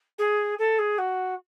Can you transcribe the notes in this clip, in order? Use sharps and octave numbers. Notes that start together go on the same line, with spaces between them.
G#4
A4
G#4
F#4